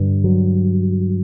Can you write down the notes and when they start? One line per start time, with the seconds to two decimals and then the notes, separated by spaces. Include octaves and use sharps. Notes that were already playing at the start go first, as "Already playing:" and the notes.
Already playing: G2 D3
0.24 F#3